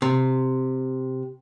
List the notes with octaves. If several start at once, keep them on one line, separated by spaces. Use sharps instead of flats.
C3